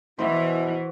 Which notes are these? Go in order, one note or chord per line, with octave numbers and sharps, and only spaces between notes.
B2 E3 E4 F#4 B4 C5